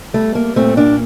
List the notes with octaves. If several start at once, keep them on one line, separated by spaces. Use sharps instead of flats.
G3 A3
A#3
A#2 A3 C4
A#3 D4